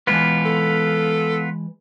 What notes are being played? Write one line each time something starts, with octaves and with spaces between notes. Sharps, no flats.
E3 G#3 B3 F4 B4
A4